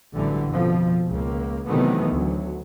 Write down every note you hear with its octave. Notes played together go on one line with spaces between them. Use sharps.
A1 F#2 D3 E3 G3
F2 B2 F3
C#2 A#3
C3 D#3 E3 F#3 A3 B3
D2 F#3